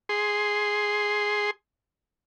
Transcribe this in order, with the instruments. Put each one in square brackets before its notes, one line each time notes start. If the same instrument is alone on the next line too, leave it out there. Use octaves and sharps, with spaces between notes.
[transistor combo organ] G#4 C6